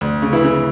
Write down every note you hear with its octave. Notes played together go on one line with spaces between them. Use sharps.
D2
C#3
E3 E4
C#3